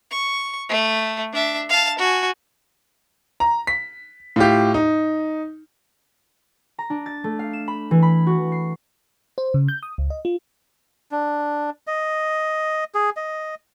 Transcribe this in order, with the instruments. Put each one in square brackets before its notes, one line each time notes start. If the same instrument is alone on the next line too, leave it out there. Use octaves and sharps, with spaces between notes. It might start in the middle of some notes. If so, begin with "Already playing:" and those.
[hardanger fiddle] C#6
A3
D4 E5
F5 A5
F#4 G#5
[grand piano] A#5
B6
A2 F4 G4
D#4
[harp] A#5
D4
A6
A3
F5
E7
B5
E3
B5
F#4
C7
[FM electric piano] C5
C#3
G6
D#6
C#2
D#5
F4
[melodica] D4
D#5
G#4
D#5